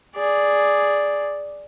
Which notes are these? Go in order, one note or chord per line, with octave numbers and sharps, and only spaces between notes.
G#4 D5